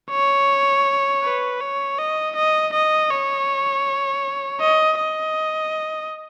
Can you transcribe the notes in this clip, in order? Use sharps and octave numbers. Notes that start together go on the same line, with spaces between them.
C#5
B4
C#5
D#5
D#5
D#5
C#5
D#5
D#5